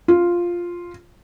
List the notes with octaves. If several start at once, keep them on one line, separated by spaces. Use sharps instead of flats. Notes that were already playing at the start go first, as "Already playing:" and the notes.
F4